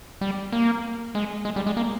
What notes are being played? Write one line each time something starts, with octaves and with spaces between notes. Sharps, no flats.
G3
A#3
G#3
G#3
G3
G#3
A#3